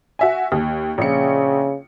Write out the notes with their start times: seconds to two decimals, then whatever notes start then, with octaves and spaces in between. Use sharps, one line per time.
0.19 F#4 E5 G#5
0.52 D#2
0.98 A#1 C#3 C#7